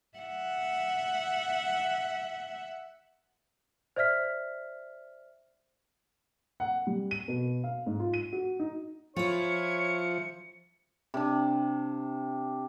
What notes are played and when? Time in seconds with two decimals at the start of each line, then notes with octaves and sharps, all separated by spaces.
0.18 E5 F#5
3.96 C5 D5 E5 F6 B6
6.60 F#5
6.87 G3
7.11 D#7
7.28 B2
7.64 F5
7.86 G#2
8.00 F4
8.14 D#7
8.32 F#4
8.59 D#4
9.16 F3 E4 F4 C#5 C#7
11.14 C3 D4